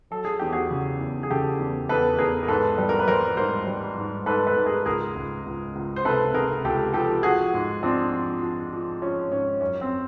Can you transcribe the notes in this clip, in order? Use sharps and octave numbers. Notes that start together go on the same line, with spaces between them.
F#3 A4
G#4
E2 G4
F#4 G#4
C#3
E2
G#4
C#3 G4 A4
E2
E2 A4 B4
E2 G#4 A#4
A#4
G#2 A4 B4
G3
A#4
B4
G3 A#4 C5
G#2 A#4 C5
G3
G#2
G#2 A4 B4
A4 B4
G#2
G#4 A#4
C#2 G#4 A#4
C#2
C#2
C#2
C5
C3 A4 B4
C3 G#4 A#4
C#2 G4 A4
F3 G4 A4
F3 F#4 G#4
G#2
F3 C4 D4
F3
F3
F3
F3 C#4
G#2 C#4
F#2 C#4
C4